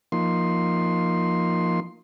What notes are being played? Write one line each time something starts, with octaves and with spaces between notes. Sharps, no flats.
F3 A#3 D#4 C6